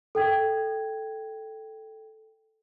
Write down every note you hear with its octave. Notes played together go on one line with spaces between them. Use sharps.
A4 G5 G#6